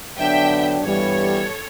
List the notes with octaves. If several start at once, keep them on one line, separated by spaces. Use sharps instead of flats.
D3 F#3 B3 D4 E5 G5
G2 E3 G3 B3 A4 C#5